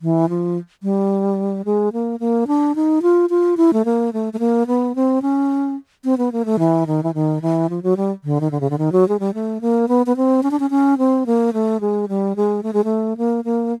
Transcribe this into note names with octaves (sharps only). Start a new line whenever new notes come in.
E3
F3
G3
G#3
A#3
A#3
D4
D#4
F4
F4
E4
A3
A#3
A3
A3
A#3
B3
C4
C#4
C4
B3
A#3
A3
E3
D#3
E3
D#3
E3
F3
F#3
G3
D3
D#3
D3
C#3
D3
D#3
F#3
G#3
G3
A3
A#3
B3
B3
C4
C#4
D4
C#4
C#4
C4
A#3
A3
G#3
G3
G#3
A3
G#3
A3
A#3
A#3